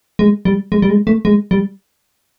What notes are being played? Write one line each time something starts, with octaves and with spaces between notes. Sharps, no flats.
G#3
G3
G#3
G3
G#3
A3
G#3
G3